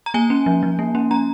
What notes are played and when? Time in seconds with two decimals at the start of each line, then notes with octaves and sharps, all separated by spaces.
0.06 A#5
0.14 A#3 G#5
0.30 C#4
0.46 F3
0.63 F3
0.79 A#3
0.95 C#4
1.11 C#4 A#5